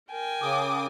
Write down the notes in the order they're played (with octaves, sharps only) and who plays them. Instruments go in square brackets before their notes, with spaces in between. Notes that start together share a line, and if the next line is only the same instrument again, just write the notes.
[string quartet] A#4 G5 G#5
[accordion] C#3 D6 D#6